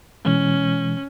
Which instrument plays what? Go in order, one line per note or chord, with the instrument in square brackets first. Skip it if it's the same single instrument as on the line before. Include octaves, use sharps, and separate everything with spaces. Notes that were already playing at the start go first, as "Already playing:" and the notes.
[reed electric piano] B2 E3 G#3 [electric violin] C#4